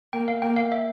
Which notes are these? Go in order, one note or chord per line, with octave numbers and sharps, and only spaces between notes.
A#3 G5
F5
A#3 G5
F5
E5